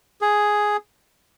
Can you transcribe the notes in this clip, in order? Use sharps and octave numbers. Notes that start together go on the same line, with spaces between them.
G#4